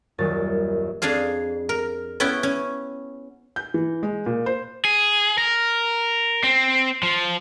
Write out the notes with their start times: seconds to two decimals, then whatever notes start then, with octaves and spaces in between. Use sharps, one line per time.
0.18 D#1 F#2 D#4 A6
1.02 F2 D4 G#4 F5
1.69 A#4
2.20 B3 C#4 E4 G5
2.43 C#4
3.56 G6
3.74 E3
4.03 G#3
4.26 A#2
4.46 C5
4.85 G#4
5.38 A#4
6.44 C4
7.03 F3